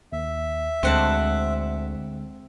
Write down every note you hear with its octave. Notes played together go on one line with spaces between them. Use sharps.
D#2 E5
D2 D3 G#3 C4 F#5 A5